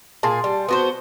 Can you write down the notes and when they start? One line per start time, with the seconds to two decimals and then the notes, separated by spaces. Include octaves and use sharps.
0.23 A#2 G#4 A5 C6
0.44 G3
0.68 B3 F#4 C5